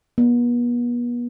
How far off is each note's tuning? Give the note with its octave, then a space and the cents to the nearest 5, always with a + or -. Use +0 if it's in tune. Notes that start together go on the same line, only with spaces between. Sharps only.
B3 -40